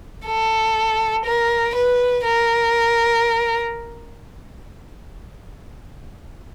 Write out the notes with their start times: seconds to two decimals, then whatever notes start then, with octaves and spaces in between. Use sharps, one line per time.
0.26 A4
1.25 A#4
1.75 B4
2.25 A#4